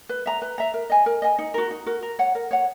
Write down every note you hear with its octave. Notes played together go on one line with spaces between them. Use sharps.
B4
E5 A#5
B4
E5 A#5
A#4
D#5 G#5
A#4
D#5 G#5
D#4
F#4 A#4
D#4
F#4 A#4
A#4
C#5 F#5
A#4
C#5 F#5